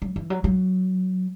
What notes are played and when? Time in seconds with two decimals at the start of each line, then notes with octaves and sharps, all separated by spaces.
0.02 F#3
0.16 E3
0.30 F#3
0.44 F#3